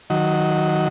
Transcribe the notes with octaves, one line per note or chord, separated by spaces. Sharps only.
D#3 F#3